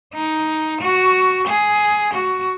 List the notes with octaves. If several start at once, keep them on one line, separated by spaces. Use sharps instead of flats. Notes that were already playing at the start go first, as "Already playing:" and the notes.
D#4
F#4
G#4
F#4